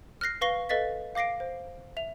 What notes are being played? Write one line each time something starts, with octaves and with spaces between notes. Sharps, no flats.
F6 F#6 A#6 C7
B4 F5 C#6 A#6 C7 G7
A4 B4 D#5 F5 A6 B6
F5 D6 A#6 C7 D7
C5
E5 F7